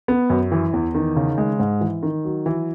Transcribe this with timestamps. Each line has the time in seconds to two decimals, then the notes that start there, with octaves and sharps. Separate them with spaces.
0.08 B3
0.30 F#2
0.52 E3
0.73 E2
0.94 D#3
1.16 C#3
1.38 G#3
1.59 G#2
1.81 E3
2.03 D#3
2.24 F#3
2.46 E3